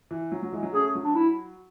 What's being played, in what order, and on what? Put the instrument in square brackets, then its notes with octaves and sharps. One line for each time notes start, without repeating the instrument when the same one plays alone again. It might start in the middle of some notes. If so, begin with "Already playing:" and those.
[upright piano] E3
F#3
F#3
E3 G#3
F#3
[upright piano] A3 C#4 [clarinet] G#4
[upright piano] F#3
[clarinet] D4
E4